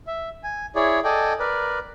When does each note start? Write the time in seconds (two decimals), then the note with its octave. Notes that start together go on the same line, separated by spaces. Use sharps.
0.07 E5
0.44 G#5
0.76 E4 G#4 C#5 D5
1.04 A4 D5 D#5 G5 G#5
1.39 A#4 B4 D5